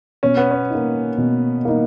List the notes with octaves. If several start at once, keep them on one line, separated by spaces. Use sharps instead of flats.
B2 C#4
B3
C#4
A#3 D#4
B2
A#3 D#4